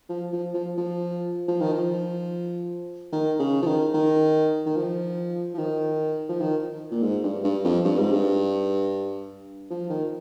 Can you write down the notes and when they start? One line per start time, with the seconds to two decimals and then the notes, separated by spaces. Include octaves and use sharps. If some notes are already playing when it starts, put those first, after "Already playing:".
0.09 F3
0.33 F3
0.54 F3
0.78 F3
1.48 F3
1.61 D#3
1.72 F3
3.12 D#3
3.39 C#3
3.62 F3
3.67 D#3
3.94 D#3
4.66 D#3
4.77 F3
5.54 F3
5.59 D#3
6.29 F3
6.41 D#3
6.91 A#2
7.03 G#2
7.24 G2
7.44 G2
7.64 F2
7.85 G2
7.99 G#2
8.12 G2
9.70 F3
9.90 D#3